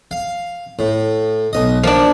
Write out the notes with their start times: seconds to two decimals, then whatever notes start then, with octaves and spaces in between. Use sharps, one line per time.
0.11 F5
0.79 A2
1.53 B1 D#5
1.84 F3 A#3 D4